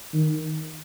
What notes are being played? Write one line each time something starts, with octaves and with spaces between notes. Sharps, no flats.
D#3